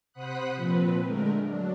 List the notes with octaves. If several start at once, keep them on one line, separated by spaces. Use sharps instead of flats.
C3 C5 F#5 B5 D#6 F#6
A#2 F3 C4 B4
D3 G#3 A3 A#4
F#3 D4